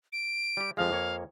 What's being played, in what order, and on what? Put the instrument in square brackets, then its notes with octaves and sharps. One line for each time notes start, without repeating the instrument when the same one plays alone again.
[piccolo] D7
[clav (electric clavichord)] G3 G4
[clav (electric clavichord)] F2 F3 G#3 [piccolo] F5
[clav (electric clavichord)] F2 A#3 C#5